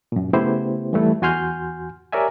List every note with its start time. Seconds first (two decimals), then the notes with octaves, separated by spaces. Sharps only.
0.12 F#2 A#2
0.33 C#3 A3 B3 E4 G4 C5
0.93 E3 G3 A3 E4
1.22 E2 F#4 G#5 C6 F6 G6
2.13 G4 A#4 C#5 D5 E5 G#5